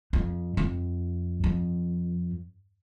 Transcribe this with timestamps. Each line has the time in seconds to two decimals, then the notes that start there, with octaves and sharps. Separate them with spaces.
0.13 F2
0.57 F2
1.44 F2